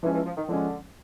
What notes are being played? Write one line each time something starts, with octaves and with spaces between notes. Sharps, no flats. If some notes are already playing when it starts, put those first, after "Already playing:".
E3 F3 G#3 C#4
E3
F3
D#3
D3 F3 G#3 C#4